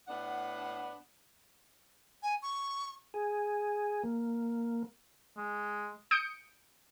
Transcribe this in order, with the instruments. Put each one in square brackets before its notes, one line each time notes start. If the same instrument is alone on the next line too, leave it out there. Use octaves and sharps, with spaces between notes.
[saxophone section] A2 B3 D4 F#5
[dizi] G#5
C#6
[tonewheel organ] G#4
A#3
[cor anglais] G#3
[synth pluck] D#6 G6 C#7 D7